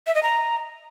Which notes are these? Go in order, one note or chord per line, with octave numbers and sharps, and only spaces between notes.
E5
D#5
A#5